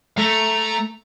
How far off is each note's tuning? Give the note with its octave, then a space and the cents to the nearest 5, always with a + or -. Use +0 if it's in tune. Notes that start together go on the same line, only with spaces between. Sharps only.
A3 +0 A#5 +0